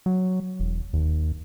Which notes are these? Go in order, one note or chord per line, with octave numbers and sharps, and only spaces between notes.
F#3
E1
D#2